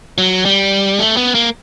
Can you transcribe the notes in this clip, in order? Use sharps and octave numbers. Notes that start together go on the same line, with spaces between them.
F#3
G3
A3
B3
A#3